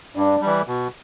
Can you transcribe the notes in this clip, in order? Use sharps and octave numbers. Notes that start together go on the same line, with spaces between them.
G2 D4
E3 G3
B2